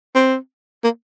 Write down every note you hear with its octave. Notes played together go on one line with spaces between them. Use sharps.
C4
A#3